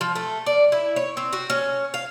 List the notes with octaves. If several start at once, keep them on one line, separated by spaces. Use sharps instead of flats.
F3
A3
D5
E4
C#5
C4
F#4
C#4
F5